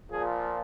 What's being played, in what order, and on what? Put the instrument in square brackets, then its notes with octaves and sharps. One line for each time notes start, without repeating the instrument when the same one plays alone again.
[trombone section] A#2 F3 G#4